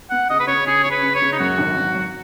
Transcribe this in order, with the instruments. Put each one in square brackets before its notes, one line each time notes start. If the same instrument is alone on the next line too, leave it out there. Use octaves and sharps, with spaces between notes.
[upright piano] B3 [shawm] F#5
[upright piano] C#3 [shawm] D#5
[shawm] B4
[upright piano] C#3 [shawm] C#5
[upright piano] C#3 [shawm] G#4
[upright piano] C#3 [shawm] C#5
[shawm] B4
[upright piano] C#3
[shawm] C#5
[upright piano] C#3
[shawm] D#4
[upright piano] F#2 [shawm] F#4
[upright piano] G#1
F#3
F#3